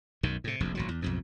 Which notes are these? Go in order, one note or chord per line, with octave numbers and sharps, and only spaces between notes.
B1 F#2 D#3
A2 C3
F1 A#1 F2
G#1 A#2 F#3
E2
B1 F2 G#2